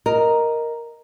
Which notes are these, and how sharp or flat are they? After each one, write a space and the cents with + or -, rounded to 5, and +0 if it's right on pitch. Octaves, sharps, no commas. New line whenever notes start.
A#4 +0 D#5 +0